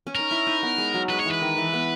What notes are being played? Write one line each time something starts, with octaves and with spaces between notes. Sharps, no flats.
C#4
D#4 A#4
E4
D#4
B3
G#3
F#3
G#3 B4
C#5
E3
B4
D#3
E3
B3